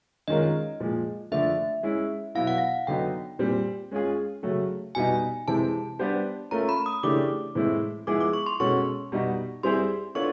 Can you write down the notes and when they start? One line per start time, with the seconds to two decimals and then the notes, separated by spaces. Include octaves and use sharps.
0.28 D#3 G#3 C#4 F4 A#4 D#5
0.80 A#2 F3 G#3
1.32 D3 F3 A3 D4 E5
1.83 G#3 C#4 E4
2.35 B2 F#3 B3 E4 F5
2.47 F#5
2.58 F5
2.87 D3 F#3 B3 D#4 G5
3.39 A#2 G3 C4
3.91 G#3 C#4 F4 G#4
4.43 C#3 F#3 A3
4.95 B2 G3 B3 D#4 G#5
5.48 C3 E3 G#3 C4 A5
5.99 G3 B3 D4 G4 C5
6.51 A3 C#4 F4 A#4 A#5
6.69 B5
6.86 D#6
7.03 C#3 E3 A3 D4 G4 D6
7.55 A2 E3 G#3 C4 E4
8.07 F3 G#3 B3 E4 G#4 D6
8.20 D6
8.33 C#6
8.46 C6
8.60 B2 G#3 C#4 F#4 A4 C#6
9.12 B2 G3 B3 D#4 F#4
9.63 G3 C4 E4 G#4 C5 C6
10.15 B3 D4 F4 A4 C#5 C#6